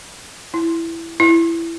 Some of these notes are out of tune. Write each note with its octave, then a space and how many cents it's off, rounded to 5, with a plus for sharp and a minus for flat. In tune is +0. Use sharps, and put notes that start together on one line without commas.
E4 +10
E4 +15